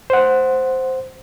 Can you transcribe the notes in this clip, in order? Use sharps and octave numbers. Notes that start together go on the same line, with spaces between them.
C5 F#5